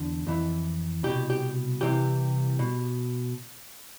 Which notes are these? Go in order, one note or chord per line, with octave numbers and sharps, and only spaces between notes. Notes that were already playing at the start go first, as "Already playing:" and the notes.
Already playing: E2 D3
F2 E3
C2 B2 G4
G4
C2 C3 E3 G4
B2